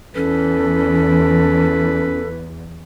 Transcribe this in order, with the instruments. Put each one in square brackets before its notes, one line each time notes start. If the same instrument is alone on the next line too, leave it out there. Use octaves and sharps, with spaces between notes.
[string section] E2 [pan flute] C#4 [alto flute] A4 [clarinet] B4